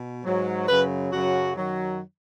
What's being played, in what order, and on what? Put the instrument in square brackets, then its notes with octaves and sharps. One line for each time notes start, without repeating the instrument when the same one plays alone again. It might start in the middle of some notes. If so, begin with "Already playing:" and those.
Already playing: [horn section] B2
G#2 F#3
F#2 C#3 F#3 B4
F#2 C#3 F#3 F#4
F#2 D#3 F#3